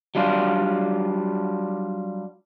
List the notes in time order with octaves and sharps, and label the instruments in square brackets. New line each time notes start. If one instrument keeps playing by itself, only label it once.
[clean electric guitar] F#3 G3 D4 F4